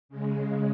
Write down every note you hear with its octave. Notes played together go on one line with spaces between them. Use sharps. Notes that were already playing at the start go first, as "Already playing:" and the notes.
C#3 G#3